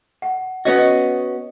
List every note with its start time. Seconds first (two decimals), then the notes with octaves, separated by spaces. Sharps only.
0.22 F#5
0.65 B3 C#4 F#4 D#5